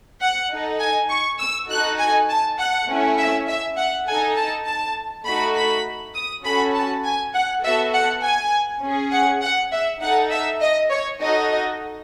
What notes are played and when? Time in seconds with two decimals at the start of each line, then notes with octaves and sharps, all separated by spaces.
0.21 F#5
0.50 D#4 A4
0.80 G#5
1.09 C#6
1.39 E6
1.69 D#4 F#4 A4 F#6
1.99 G#5
2.29 A5
2.59 F#5
2.88 A3 C#4 E4
3.18 E5
3.48 E5
3.77 F#5
4.07 A4 G#5
4.11 D#4
4.36 A5
4.66 A5
5.25 A3 D#4 F#4 A4 B5
5.55 B5
6.14 D#6
6.45 C#4 F#4 A4 B5
6.74 A5
7.04 G#5
7.34 F#5
7.63 B3 F#4 A4 E5
7.93 F#5
8.23 G#5
8.82 C#4 G#4
9.12 F#5
9.42 F#5
9.72 E5
10.02 D#4 A4 F#5
10.31 E5
10.61 D#5
10.90 C#5
11.20 D#4 F#4 A4 D#5